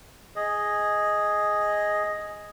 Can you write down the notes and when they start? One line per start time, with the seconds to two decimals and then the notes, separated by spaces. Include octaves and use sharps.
0.36 G#4 D#5